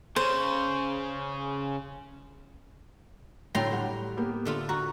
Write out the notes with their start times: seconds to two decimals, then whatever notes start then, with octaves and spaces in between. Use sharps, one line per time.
0.16 C#3 C5
3.55 A2 D3 F#3 G5 A#5 C6
3.71 G3 G4 F#5
4.17 A#3 B3 G4
4.45 D3 A3 F4
4.69 F#4 A#5